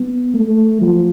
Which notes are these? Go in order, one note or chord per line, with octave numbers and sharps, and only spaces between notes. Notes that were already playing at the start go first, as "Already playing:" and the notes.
Already playing: B3
A3
F3